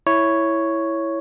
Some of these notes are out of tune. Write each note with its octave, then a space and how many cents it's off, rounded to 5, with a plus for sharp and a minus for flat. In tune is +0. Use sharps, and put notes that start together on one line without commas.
E4 +0 C#5 +0